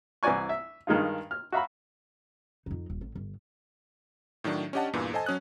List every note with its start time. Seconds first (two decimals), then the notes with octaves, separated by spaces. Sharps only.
0.23 C2 E3 F#4 D5 G#5 C#6
0.49 E5
0.87 G2 D#3 G#3 D#4 F4
1.31 F6
1.52 F#4 E5 F5 A#5 B5
2.66 F2 D#4
2.90 D#1
3.01 A1 A2
3.15 G1
4.44 A2 D#3 F#3 D4
4.73 C#4 D4 G4 D#5 F#5 A5
4.93 E2 G2 A#2 E3
5.13 A4 C5 D#5 G#5 A5
5.26 F#3 C#4 D#6 F#6